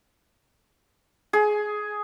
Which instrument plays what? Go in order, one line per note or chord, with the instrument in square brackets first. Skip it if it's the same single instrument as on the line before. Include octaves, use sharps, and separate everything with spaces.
[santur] G#4